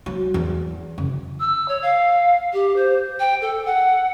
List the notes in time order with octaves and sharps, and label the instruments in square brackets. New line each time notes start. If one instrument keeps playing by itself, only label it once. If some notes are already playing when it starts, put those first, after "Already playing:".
[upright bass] F#3
E2
F#1
[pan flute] E6
C#5
F5
G4
C5
G5
A4
F#5